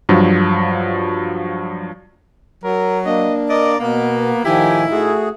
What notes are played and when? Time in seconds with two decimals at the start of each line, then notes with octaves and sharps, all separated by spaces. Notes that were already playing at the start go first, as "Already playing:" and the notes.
0.09 G2 F3 F#3
2.64 F#3 A#4
3.06 A#3 D4 D#5
3.50 A#4 D5 D#5
3.80 B2 A#3 B3
4.45 A2 D#3 F3 D#4 E4 G4 G#5
4.92 A3 F#4 G#4